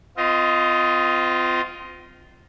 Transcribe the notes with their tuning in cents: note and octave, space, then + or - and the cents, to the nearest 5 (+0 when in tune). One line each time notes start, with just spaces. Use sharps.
C4 -35 F4 +0 D#5 +15